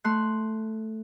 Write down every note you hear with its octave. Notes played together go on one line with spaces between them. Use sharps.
A3 C6 F#6